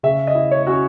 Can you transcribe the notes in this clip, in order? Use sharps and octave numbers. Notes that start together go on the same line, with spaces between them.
C#3 E5
D#5
E4
C#5
C#4 F#4